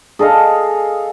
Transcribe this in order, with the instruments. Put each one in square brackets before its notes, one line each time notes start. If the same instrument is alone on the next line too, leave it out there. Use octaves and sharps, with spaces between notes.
[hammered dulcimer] G#4 A4 D#5 F5